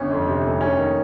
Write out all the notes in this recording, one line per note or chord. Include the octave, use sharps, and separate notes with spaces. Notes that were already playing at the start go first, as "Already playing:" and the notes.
Already playing: G1 C#4
F2
C3
F1
D#2 C#4
D#3